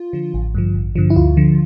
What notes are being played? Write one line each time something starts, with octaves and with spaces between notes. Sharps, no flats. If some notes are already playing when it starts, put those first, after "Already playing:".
Already playing: F4
D3 F3
A1
G2 D3 F3
A1
G2 D3 F3
E4
D2 F4
D3 F3